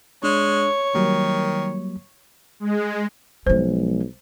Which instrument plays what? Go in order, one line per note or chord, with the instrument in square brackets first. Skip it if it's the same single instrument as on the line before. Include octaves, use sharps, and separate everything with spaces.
[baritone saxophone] G#3 [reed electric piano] D4 [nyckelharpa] C#5
[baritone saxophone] D#3 [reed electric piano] F#3 G3 A#3
[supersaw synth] G#3
[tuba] B1 [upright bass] F3 G#3 [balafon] C5